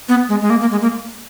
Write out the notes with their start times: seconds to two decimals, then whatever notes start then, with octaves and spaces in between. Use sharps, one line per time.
0.09 B3
0.29 G#3
0.42 G#3
0.50 A#3
0.61 A#3
0.71 G#3
0.81 A#3